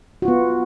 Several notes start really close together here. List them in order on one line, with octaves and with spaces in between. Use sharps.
F#4 F4 B3